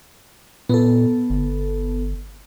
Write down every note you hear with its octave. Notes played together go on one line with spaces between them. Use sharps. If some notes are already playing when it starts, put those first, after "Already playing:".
A#2 B3 A4
G1